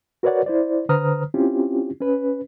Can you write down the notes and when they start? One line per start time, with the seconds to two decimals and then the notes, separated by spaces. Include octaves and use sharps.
0.23 F#4 A#4 B4 C#5 D5 F#5
0.46 E4 C5 D5
0.89 D3 B4 C5 A#5 D#6 F6
1.34 C4 C#4 E4 F4 G4
2.01 C#4 B4